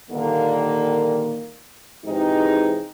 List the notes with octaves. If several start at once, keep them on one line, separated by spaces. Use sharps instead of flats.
A#2 D3 D#3 G3 A#3
G#2 C3 E3 G#3 C4 D#4